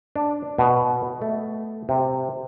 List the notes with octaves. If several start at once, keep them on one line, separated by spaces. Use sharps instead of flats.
D4
B2
A3
C3